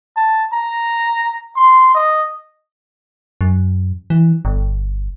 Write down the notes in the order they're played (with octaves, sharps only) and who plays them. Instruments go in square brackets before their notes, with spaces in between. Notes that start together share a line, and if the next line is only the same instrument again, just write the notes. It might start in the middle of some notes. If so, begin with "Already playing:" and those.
[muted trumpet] A5
A#5
C6
D#5
[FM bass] F#2
E3
G1